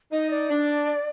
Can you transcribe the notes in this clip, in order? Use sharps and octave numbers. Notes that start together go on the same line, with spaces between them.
D#4 D#5
D5
D4